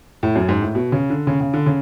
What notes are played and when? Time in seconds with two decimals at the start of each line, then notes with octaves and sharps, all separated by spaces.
0.23 A2
0.35 F#2
0.49 G#2
0.62 A2
0.75 B2
0.92 C#3
1.10 D3
1.27 C#3
1.41 C#3
1.54 D3
1.66 C#3